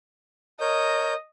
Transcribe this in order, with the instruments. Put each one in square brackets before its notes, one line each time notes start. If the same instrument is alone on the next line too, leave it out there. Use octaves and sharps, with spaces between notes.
[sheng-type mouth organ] A#4 C#5 G6 [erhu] D#5